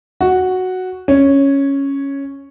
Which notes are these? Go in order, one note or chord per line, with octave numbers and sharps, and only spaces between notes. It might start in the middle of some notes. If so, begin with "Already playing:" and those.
F#4
C#4